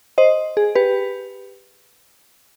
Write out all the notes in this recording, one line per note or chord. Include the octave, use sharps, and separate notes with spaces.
C5 D#5
G#4
G4 B4